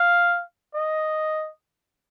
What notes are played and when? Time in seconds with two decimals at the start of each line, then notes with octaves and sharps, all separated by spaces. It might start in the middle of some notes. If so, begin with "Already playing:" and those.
Already playing: F5
0.75 D#5